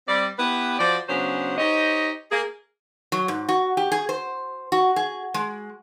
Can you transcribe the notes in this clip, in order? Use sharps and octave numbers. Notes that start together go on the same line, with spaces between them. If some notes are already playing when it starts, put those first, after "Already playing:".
G3 C4 D5
B3 E4 G4 B4
F3 F#4 C5 D5
C#3 F#3 B3 C#4 D4 C5
D#4 G4 C5 C#5 D#5
A#3 G#4
F#3
G#2
F#4
G4
G#4
C5
F#4
G#4
G#3